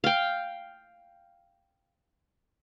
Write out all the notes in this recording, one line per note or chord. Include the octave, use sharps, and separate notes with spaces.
F5 G5